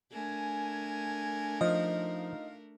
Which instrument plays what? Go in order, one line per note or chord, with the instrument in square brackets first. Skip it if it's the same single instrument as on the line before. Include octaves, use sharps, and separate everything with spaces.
[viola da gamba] A3 D4 A#4 [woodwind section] G#5
[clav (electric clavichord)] F3 [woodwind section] D#4 F4 F5 [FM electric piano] D#5